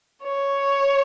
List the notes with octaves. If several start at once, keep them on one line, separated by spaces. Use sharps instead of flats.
C#5